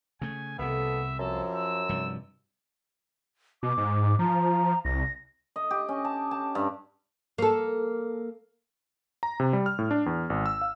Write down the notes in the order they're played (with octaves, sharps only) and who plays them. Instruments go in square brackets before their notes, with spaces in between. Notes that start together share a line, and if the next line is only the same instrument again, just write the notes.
[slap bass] C#3 A3 [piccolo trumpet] G#5
[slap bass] C2 C3 [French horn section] F2 A#3 A4 [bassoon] B3 [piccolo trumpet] E5
[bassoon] F#2 [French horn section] F3 [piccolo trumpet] A4
[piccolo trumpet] E6
[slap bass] G2 C3 F3
[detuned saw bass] B2 [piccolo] D6
[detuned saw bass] G#2
[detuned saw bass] F3 [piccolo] A#5
[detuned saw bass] C2 [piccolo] A#6
[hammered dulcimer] D#5
G4
C#4
A5
A5
G2
[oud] A#3 A4
[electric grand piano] A#5
C3
G3
F6
A2
D4
E2
G#1
E6
F5